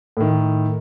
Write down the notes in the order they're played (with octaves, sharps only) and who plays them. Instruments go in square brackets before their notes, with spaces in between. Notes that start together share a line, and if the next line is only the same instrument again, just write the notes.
[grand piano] A2 D#3